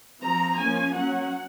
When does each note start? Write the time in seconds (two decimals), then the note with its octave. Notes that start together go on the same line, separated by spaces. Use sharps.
0.21 F3 C4 A#5
0.58 F3 A#3 C#4 G#5
0.94 F#3 C#4 F#5